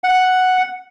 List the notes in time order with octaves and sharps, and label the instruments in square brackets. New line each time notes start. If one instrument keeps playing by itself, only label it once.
[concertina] F#5